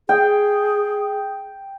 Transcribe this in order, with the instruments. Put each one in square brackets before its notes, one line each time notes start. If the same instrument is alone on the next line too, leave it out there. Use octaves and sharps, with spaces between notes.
[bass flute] G#4 [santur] G5